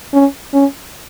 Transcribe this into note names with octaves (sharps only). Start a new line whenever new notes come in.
C#4
C#4